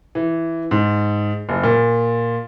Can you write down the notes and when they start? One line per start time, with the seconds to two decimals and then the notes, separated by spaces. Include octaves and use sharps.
0.15 E3
0.71 G#2
1.49 F#1
1.63 A#2